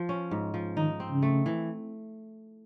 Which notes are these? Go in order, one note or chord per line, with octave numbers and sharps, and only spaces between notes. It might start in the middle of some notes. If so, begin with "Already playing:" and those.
Already playing: F3
C#4
G#2
F3
D#3 D#4
C4
C#3
A3
E3